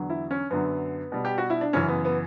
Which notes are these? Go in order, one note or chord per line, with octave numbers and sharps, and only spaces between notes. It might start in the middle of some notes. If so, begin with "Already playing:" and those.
Already playing: E2 D3 F#3
E4
C#4
F#2 D3 F#3 B3
B2 G3
G4
F#4
E4
D4
F#2 C#3 E3 C#4
B3
B3